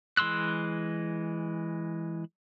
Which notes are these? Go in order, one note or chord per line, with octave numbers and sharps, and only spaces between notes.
E3 G#3 C6 E6 F#6